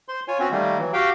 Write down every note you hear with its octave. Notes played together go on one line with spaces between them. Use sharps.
C5 C6
F4 C#5 G#5
C4 C#4 F#4
D#3 G3 A3 A#3
E3 F#3
F#4 G4 F5 G5